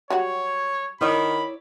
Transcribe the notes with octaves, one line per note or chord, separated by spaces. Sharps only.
F#3 G3 F#4 C#5
D#3 E4 C#5 D5 B5